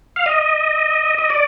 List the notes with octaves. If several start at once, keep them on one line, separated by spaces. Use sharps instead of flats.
F5
D#5
D#5
D5